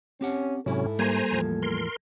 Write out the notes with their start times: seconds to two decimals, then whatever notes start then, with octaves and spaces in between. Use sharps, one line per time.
0.21 C4 C#4 G4 F#5
0.66 G#2 C3 F#3 C#4 E4 A4
0.99 G3 A#3 C5 G#5 A#5 G#6
1.31 E2 A2 F3
1.62 A#4 C6